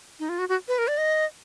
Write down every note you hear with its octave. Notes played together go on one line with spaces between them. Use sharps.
D#4
F4
F#4
F#4
B4
A#4
D5
D#5